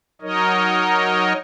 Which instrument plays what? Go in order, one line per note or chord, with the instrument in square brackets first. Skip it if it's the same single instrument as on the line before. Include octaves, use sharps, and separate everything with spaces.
[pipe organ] F#3 D#4 A#4 C#5 D#5